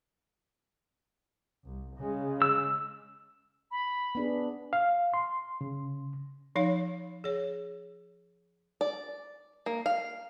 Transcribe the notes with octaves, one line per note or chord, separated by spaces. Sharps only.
C2
C#3 G#3
E6
B5
B3 D4 G#4
F5
C6
C#3
F3 D#4 C#5 F5
G#4 C#5
D5
A#3
F5